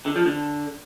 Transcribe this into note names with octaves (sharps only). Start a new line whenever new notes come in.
D3
F3
D3